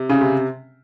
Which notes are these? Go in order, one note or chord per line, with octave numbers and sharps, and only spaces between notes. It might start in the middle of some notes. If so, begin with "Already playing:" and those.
Already playing: C3
C#3
C3